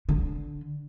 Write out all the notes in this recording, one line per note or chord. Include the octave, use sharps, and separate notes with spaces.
D3